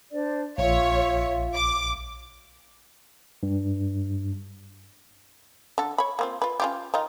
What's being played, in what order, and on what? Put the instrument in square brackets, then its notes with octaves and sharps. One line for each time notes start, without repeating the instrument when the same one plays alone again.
[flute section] D4 C5 D5
[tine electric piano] A#1 [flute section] F4 E5 F5 [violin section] C#5
[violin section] D6
[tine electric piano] G2
[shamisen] D3 A4
C#5 B5
A#3 C4 F4
F4 B4
C#4 F4 G4
D#3 D#4 F4